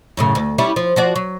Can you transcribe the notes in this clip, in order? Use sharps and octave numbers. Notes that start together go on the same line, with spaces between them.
F#2 A2 C#3
D2
G3 C#4 E4
F3
F3 F#4 D5
F#3